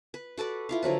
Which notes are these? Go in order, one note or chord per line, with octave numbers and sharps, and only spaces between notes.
B4
F#4 A4 B4 D5
E4 F4 F5
D3 F3 F#3 B4